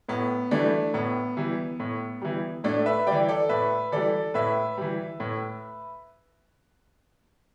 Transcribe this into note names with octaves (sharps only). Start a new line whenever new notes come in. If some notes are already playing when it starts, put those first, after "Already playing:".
A2 B3
E3 G3 A3 D4
A2 B3
E3 G3
A2
E3 G3
A2 A3 D4
B4 E5
E3 G3 D5 G5
A4 D5
A2 B4 E5
E3 G3 A4 D5
A2 B4 E5
E3 G3
A2